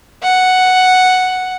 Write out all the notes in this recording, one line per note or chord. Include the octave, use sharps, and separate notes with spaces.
F#5